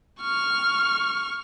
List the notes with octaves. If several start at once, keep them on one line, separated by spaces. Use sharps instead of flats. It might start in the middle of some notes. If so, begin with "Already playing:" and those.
C#6 F6